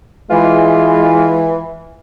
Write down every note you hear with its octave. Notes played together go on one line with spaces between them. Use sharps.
E3 G#3 F4